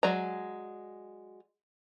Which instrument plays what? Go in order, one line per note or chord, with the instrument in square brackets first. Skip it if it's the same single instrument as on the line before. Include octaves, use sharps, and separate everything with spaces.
[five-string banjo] F#3 G#3 D5 A#5